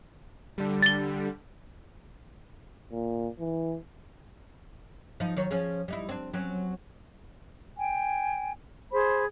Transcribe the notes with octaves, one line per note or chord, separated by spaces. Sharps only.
D3 G3
A6 G7
A#2
E3
F3 D#4
D#3 F#3 C#5
F3 C#4 G#4
G3 D#4 E4
C4 D4
F#3 C4 C#4
G5 G#5
G#4 C5 B5